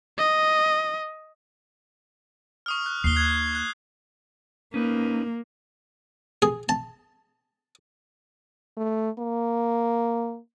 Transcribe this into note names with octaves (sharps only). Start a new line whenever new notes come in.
D#5
C#6 D#6 F6
F#6
D#2 D#4 C7 G7
F#6 G#6
F#6
A#3 C#4 D#4 B4
G#4
A5
A3
A#3